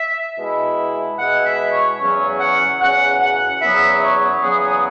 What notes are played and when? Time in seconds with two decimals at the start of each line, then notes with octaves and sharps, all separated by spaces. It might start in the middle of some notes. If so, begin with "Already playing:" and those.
Already playing: E5
0.38 B2 G#3 E4
1.19 B2 G#3 E4 F#5
1.46 E5
1.73 C#5
2.00 E2 C#3 F#3 C#4 C#5
2.40 F#5
2.80 E2 C#3 F#3 C#4 F#5
3.22 F#5
3.62 E2 C#3 F#3 B3 E5
4.02 C#5
4.43 E2 C#3 F#3 B3 G#4
4.64 G#4